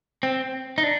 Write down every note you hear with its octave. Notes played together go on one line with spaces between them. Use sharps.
C4
D#4
D4